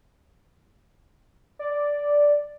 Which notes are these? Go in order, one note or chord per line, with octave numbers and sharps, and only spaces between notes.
D5